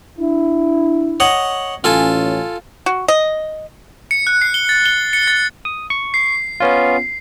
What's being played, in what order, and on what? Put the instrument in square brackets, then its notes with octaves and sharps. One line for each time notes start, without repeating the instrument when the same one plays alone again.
[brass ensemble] D4 E4
[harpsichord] C#5 D#5 F#5
[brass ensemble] A1 C#4 [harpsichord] F4 A4 G#5
[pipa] F#4
D#5
[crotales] C#7
F#6
C7
G7
A6
G7
C#7
A6
[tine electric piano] D#6
C#6
[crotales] C7
[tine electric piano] B3 C#4 F4